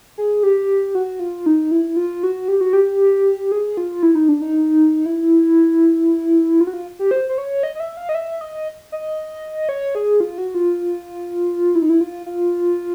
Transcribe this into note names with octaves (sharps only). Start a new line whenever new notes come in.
G#4
G4
F#4
F4
D#4
E4
F4
F#4
G4
F#4
G4
G#4
F4
E4
D#4
D4
D#4
E4
F4
F#4
F4
G4
C5
C5
C#5
D#5
D#5
E5
F5
D#5
E5
D#5
D#5
C#5
G#4
F4
F#4
F4
E4
D#4
E4
F4
F4